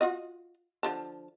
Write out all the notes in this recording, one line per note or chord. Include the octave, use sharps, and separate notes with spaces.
F4 F#4 D#5
D3 F3 A5